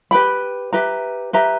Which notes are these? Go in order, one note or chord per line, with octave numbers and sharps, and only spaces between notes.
G4 B4 G5 B5
G4 B4 E5 A#5
G4 B4 E5 A#5